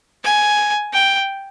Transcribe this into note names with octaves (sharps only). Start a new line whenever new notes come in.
G#5
G5